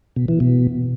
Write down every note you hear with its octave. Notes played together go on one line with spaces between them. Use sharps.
B2
E3
B2